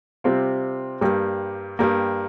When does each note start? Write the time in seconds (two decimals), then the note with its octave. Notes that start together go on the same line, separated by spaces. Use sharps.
0.24 C3 G3 C4 F4
1.01 G2 G3 A#3
1.79 G2 G3 A#3